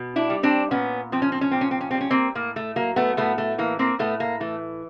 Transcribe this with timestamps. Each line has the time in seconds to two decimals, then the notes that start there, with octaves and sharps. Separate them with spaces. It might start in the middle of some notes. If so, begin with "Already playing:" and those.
Already playing: B2
0.16 D4 E4
0.30 G3
0.43 C4 D4
0.71 A#2 B3 C#4
1.12 F3 C4
1.22 C#4
1.32 C4
1.41 C#4
1.51 A#2 C4
1.61 C#4
1.71 C4
1.81 C#4
1.91 G3 C4
2.01 C#4
2.10 A#3 C4
2.35 A2 A#3
2.56 A3
2.76 F#3 A#3
2.96 A3 B3
3.17 A2 A3 B3
3.38 A3
3.58 E3 A#3
3.79 A#3 C4
3.99 A2 A3 B3
4.20 A#3
4.40 E3 A3